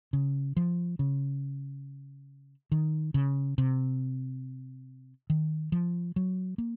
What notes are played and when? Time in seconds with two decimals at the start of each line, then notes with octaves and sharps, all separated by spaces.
0.13 C#3
0.57 F3
0.99 C#3
2.72 D#3
3.14 C#3
3.58 C3
5.30 D#3
5.72 F3
6.16 F#3
6.58 A#3